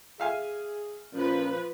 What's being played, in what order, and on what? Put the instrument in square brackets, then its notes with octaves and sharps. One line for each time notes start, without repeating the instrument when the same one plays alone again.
[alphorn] G#4 [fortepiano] E5 F5 G#5
[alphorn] A#2 [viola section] F3 B4 [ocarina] C#4